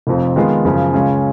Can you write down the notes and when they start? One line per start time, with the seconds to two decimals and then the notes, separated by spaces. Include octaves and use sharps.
0.07 F1 F2 F3
0.36 D#3 G#3 B3 F4
0.65 F#2 C#3 F3
0.93 C#2 C#3 G#3 C#4 F4